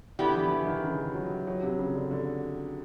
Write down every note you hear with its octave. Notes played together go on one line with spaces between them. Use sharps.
D3 B3 E4 G4
E3
E3
D#3
C#3
F#3
F#3
C3
C#3
D3
D3